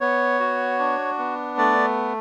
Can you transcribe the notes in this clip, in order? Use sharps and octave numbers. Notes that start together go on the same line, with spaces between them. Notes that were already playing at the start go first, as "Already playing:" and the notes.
B3 C#5
F#4
D4
B3
A3 D5